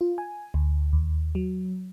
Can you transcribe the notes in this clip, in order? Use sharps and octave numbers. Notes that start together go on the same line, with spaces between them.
F4
G#5
D2
D#2
F#3